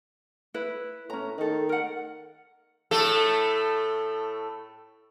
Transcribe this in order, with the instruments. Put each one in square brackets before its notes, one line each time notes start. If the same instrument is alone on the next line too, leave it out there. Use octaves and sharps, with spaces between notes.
[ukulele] E4 B4
[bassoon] A2 [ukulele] C#4 A#5
[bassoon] D#3 [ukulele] D#4 A4
[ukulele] A#4 F#5
[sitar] A2 A3 A4